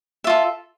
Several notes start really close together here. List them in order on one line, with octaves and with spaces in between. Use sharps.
E5 F4 A4